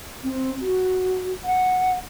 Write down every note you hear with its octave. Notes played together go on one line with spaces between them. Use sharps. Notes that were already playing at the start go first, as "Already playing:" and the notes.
C4
F#4
F#5